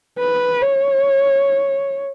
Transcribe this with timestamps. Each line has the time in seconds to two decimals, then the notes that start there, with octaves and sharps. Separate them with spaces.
0.19 B4
0.62 C#5